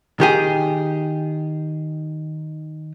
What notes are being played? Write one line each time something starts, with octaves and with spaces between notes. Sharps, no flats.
D#3 G4 G#4